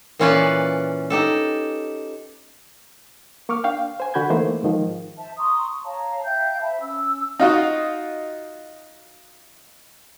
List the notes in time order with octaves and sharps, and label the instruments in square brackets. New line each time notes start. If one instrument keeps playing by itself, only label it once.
[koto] A#2 E3 C#4 F4 B4 D5
D#4 G4 A4
[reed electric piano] A#3 C#6 D6 F6
D4 F5 G5
C5 G#5
D3 F#4 B5 G6 G#6
D#3 E3 A3 A#3 C5
G#2 D#3 F3
[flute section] C5 E5 A5
A#5 C6 C#6 D#6
C#5 F5 A5 A#5
E5 F5 G5 G6
C5 E5 A5 B5
C#4 E6
[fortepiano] D#4 F4 F#4 D#5